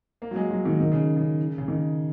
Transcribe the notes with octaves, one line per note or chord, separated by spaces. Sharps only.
A#3
F#3
G#3
F#3
D#3
D#3
C#3
C#3
C#3
D#3